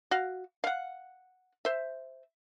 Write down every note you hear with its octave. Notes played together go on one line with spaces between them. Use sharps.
F#4 F5
F5 F#5
C5 E5